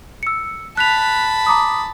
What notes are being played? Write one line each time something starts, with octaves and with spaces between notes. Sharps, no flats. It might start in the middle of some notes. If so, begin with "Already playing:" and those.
E6 C#7
A5 B5 F#6 B6 F7
A#5 D6 D#6